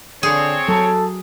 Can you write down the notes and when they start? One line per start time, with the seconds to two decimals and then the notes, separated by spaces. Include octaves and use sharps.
0.23 D3 C4 G#4 C#5
0.69 F#3 A4